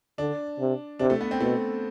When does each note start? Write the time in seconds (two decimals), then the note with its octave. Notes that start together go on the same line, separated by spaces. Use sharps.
0.18 D3 D4
0.60 C3
0.99 C3 D4
1.10 A3
1.21 B3
1.31 C4
1.41 B2 A3